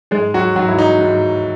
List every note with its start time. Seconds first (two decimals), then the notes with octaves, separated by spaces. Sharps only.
0.11 G#2 G#3 G#4
0.34 F#3 F#4
0.56 G#2 F#3 F#4
0.68 E4
0.79 D#4
1.01 G#2